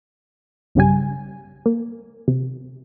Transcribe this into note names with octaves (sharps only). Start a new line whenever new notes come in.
B1 G2 C#3 G3 G#5
A#3
C3